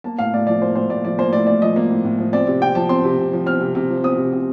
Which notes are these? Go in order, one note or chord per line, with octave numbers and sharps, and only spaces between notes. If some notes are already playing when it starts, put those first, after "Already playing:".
A#3 A5
A2 F5
A2 D5
F3 D5
A#3 C5
A2 C5
A2 D5
F3 D5
A#3 C5
A2 D5
A2 D5
F3 D#5
A#3
A2
A2
F3
C4 D5
C3
C3 G5
F3 A5
C4 C6
C3
C3
F3
C4 F6
C3
C3
F3
C4 D#6
C3
C3